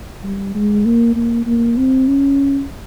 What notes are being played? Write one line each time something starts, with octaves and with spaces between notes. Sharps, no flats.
G3
G#3
A#3
A#3
A#3
C4
C#4